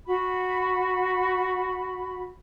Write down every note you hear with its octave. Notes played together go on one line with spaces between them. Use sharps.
F#4 B5